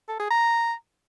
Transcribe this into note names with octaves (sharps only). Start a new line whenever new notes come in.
A4
G#4
A#5